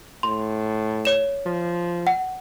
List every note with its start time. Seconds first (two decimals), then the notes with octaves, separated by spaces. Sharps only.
0.23 A2 C6
1.05 C#5 E7
1.46 F3
2.07 F#5